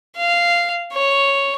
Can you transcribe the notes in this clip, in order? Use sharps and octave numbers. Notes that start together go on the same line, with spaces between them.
F5
C#5